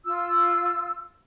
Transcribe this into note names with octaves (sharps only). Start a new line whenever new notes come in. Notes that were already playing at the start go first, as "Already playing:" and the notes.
F4 E6